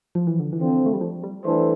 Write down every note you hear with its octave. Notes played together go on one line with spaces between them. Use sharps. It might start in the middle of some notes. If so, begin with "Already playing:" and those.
F3
E3
D3
E3
D3 F3 C4
A3
G3
F3
G3
E3 G3 A3 D4 A4 C5